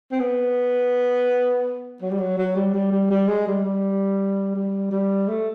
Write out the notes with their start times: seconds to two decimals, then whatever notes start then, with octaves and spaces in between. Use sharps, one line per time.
0.12 C4
0.20 B3
2.02 F#3
2.11 G3
2.19 F#3
2.38 F#3
2.56 G3
2.74 G3
2.91 G3
3.10 G3
3.28 G#3
3.47 G3
3.64 G3
4.55 G3
4.91 G3
5.28 A3